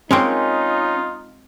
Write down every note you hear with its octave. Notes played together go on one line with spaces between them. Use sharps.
G#3 A#3 C4 C#4 D#4 F4